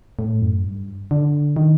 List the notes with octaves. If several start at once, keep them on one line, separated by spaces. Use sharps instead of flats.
A2
F#2
G2
D3
D#3